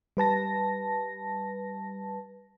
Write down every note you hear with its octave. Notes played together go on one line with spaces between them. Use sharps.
G3 B4 A5 A#6